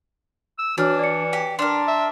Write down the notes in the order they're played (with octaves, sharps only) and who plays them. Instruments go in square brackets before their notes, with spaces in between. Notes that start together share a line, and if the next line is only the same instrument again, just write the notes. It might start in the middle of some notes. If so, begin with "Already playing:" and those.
[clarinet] E6
[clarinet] E3 [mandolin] D4 [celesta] F#4 C#5 F6
[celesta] D5 C#7
[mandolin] G4
[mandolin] D4 A#4 [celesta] C6
[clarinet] E5